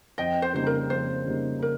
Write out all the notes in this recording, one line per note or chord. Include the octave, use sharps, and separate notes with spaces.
F2 D#5 G5
C5
C#3 G3 A#3 D#4 C5
A#4
F2 C5
C#3 G3 A#3 D#4
A#4